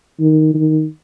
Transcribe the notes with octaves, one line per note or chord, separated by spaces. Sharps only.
D#3
D#3